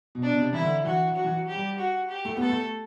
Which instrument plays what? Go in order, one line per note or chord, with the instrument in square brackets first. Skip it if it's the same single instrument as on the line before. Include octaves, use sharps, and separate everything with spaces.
[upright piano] B2
[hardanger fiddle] D4
[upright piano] B2
C3
[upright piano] E3 [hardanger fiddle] E4
[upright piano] D3
[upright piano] E3 [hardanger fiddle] F#4
[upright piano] F#3
[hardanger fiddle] F#4
[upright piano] E3
F#3
[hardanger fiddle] G4
[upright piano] G3
[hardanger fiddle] F#4
G4
[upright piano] A3
[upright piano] B3 [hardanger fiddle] A4
[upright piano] A3